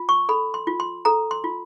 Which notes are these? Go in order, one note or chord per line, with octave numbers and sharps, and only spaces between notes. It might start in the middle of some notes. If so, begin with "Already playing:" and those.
Already playing: F4
C#6
A4 B5
C6
F4
C6
A4 A#5
C6
F4